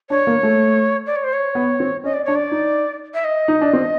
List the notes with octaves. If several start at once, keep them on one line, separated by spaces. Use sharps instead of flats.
D4 C#5
A#3
A3
D5
C#5
C5
C#5
B3
C4
C#4 D#5
D5
D4 C#5
D5
D#4
E5
D#5
D#4
D4
C4